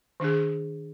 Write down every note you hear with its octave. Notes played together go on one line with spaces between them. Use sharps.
D#3 D4 G#4